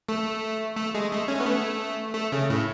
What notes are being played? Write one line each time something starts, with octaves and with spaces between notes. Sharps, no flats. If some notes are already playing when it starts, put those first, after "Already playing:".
A3
A3
G#3
A3
C#4
B3
A3
A3
C#3
A2